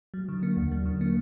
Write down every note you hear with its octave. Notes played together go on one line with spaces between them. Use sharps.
F#3
D3
A#3
D#2
F#3
D3
A#3